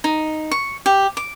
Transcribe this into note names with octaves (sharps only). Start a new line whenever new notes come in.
D#4
C#6
G4
D6